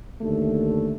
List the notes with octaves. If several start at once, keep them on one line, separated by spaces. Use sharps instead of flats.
D#2 D3 A3